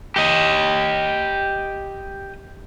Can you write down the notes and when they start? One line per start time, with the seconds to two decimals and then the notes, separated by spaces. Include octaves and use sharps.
0.16 G4 D#5